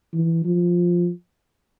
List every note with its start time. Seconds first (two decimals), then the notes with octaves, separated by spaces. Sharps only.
0.14 E3
0.45 F3